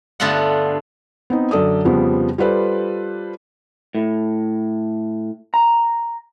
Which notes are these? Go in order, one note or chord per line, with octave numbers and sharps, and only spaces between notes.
G2 D3 A3 B3 F4 F#5
B3 C4 D#4
F#2 D3 A4 D5 D#6
F2 C#3 F3 G3 B3 C5
G3 F4 A4 B4 C5 D5
A2
A#5